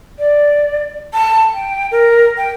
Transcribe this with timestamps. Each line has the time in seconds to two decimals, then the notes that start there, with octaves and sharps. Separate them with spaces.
0.19 D5
1.13 A5
1.54 G5
1.91 A#4
2.38 G5